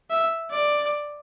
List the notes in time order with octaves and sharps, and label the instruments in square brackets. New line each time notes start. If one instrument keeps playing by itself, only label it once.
[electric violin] E5
D5